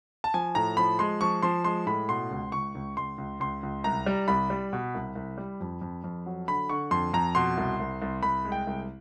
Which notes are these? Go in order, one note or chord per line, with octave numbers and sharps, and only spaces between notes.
A5
F3 G#5
A2 A#5
F3 B5
G#3 C6
F3 C#6
F3 C6
G#3 C6
A2 B5
B2 C6
C#2
C#2 C#6
C#2
C#2 C6
C#2
C#2 C6
C#2
C2 A#5
G3
C2 B5
G3
B2
C2
C2
G3
F2
F2
F2
F#3
D3 B5
D3 C#6
F2 C6
F2 A#5
B2 C6
C2
C2
C2
C2 B5
G#3
G5
C2